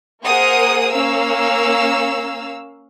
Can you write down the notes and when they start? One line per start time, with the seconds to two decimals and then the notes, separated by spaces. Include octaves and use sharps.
0.25 A#3 G#4 A#4 C5 F#5 D#6
0.91 A#3 C#4 F5 E6